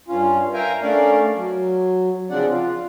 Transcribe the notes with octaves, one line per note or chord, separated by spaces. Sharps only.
G2 C#4 F4
A#4 E5 F5 G5 G#5 A#5
A3 C#4 D4 A#4 D5 F5
F#3
C#3 F3 C4 D4 D5 F#5
F4